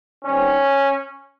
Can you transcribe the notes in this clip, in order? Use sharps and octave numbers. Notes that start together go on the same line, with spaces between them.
D#3 G3 C4 C#4